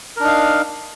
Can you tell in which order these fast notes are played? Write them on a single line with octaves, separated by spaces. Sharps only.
A#4 D4 D#4 F5